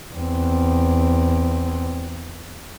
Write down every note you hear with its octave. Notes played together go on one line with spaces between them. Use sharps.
E2 C4